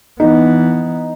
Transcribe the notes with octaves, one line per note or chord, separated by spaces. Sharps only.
E3 B3 D#4